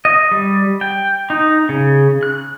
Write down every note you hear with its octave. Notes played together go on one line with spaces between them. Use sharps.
D#5
G3
G5
D#4
C#3
F#6